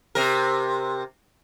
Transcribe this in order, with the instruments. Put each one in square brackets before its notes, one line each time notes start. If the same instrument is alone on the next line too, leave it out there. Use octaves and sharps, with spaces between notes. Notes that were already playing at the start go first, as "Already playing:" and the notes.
[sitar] C3 A#4